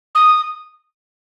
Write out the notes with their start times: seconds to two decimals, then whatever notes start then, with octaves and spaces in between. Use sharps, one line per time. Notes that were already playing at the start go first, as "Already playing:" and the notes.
0.15 D#6